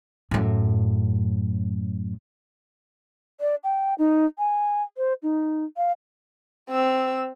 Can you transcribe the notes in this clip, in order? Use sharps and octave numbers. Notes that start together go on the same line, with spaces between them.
F#2 A2
D5
G5
D#4
G#5
C5
D#4
F5
C4 E6